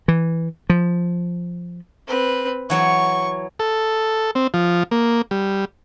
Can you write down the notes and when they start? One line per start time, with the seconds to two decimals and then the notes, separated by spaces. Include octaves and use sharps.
0.08 E3
0.70 F3
2.08 C4 B4
2.70 E3 F#3 C#5 C#6
3.59 A4
4.35 C4
4.54 F3
4.91 A#3
5.31 G3